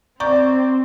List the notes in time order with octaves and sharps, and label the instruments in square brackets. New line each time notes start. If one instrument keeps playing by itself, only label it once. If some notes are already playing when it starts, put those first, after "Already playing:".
[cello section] C4 [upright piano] D5 [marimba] A#5 C#6 G6